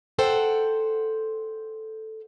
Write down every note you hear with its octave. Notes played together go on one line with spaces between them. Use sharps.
A4 C5 F#5 G5